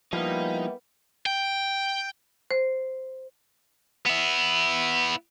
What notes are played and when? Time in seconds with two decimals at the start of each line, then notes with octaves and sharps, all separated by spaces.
0.13 F3 G3 A#3 B3 D#4 E4
1.26 G5
2.51 C5
4.06 B3 E4